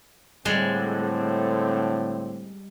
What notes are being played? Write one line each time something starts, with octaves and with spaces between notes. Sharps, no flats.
A2 D3 G3 G#3 C4